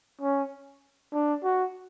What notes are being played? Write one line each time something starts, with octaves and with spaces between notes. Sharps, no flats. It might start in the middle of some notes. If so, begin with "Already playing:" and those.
C#4
D4
F#4